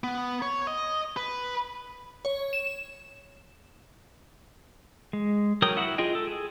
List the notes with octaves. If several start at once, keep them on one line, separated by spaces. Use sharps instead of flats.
B3
C#5
D#5
B4
C#5
E7
G#3
F#3 A#4 C#5 G5 D#6
E4 F#4 F#5
F4 G#4 D#5 G5
A4
G#4